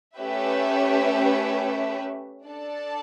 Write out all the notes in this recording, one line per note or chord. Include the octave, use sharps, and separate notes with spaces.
A3 C#4 G4 B4 E5
D4 A4 D5 A5